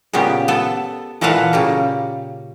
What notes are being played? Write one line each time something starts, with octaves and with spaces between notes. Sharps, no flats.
A#2 C#3 B3 G4
B3 A4
A#2 E3 A4 B4 F5 F#5
C#3 G3 A#3